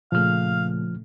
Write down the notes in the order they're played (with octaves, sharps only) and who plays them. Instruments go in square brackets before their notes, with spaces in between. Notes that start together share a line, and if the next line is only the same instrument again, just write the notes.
[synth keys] A#2 C#3 A3 [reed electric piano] F3 F6 [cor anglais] F5